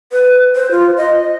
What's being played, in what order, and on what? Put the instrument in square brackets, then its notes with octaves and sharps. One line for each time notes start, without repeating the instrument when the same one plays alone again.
[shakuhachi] B4
C5
F4
D#5